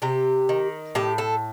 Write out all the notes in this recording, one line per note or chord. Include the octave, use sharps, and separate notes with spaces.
C3 G4
D#3
A2 G4
A4